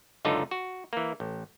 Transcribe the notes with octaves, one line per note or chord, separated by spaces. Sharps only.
C#2 F#2 D3 D#4 F4 A4
F#4
E3 A#3
A1